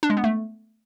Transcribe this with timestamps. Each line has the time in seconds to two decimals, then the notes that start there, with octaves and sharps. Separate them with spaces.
0.03 D4
0.10 G#3
0.17 B3
0.24 A3